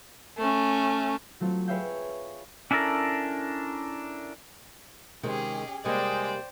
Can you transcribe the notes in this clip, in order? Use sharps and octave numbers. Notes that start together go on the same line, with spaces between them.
A3 C#4
F#3 A3 C4 F4
G#4 B4 C#5 E5 F5 G5
C#4 D4 E4 A4 A#4
C3 D#3 G#3 C#4 G4 G#4
C3 G3 G#3 A#3 C5 D5 G5